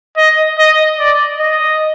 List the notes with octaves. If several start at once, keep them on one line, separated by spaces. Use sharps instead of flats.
D#5
D#5
D5
D#5